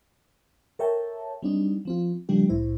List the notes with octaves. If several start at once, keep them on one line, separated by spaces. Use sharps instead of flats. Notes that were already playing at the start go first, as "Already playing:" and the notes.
A4 A#4 C#5 E5 G5 A5
F#3 G3 C4 D4 D#4
F3 C4 F4
C#3 F3 G3 A3 D4 G4
C2 A2 E4 C5